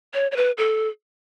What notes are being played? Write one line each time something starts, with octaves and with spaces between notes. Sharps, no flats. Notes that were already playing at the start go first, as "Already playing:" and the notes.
C#5
C#5
B4
A4